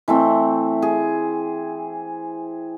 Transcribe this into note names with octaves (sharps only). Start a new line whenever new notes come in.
E3 A3 C4
G#4